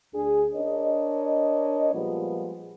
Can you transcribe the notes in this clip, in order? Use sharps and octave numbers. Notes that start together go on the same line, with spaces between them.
D2 D4 G#4
D4 A#4 C#5 D#5
A#2 F3 G3 G#3 B3